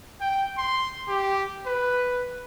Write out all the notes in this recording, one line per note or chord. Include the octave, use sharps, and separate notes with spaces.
G5
C6
G4
B4